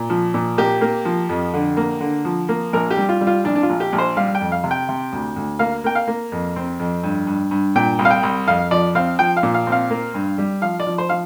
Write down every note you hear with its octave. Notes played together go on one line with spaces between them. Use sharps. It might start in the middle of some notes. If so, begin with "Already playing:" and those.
Already playing: A#2
F3
A#2
A#3 G4
A#3
F3
F2
D3
A#3
D3
F3
A#3
A#1 A#4
G4
G3
F4
G3
F4
A#1 D4
D4
F4
A#1
G4
A#1
C5
G3 F5
G5
F2
F5
C3
G5
C3
D2
D2
A#3 F5
A#3 G5
F5
A#3
F2
C4
F2
G2
G2
G2
A#2 G5
C2
F5
G5
C2
F2 F5
F3 D5
C4 F5
F3 G5
F5
A#2
F5
C4 F5
A#3
G2
G3
F3 F5
D5
F3
C5
F3 F5